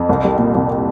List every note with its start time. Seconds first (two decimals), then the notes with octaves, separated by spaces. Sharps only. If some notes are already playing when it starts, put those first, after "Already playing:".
Already playing: F2
0.09 C2
0.24 G3
0.38 A#2
0.55 C2